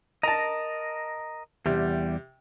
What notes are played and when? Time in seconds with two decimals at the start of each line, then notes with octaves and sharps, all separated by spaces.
0.23 A#4 D#5 A5 A#5
1.66 E2 C3 G3